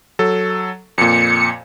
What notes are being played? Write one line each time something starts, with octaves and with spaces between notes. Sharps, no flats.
F#3 A4
F2 A#2 C#7